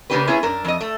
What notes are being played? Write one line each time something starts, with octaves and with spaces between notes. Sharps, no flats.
C#3 A#3 B3 D4 G4 B4
A#3 B3 C#4 E4 G#4
F#2 D4 A#4
F2 D#5
A3